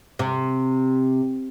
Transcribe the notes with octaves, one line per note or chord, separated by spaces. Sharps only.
C3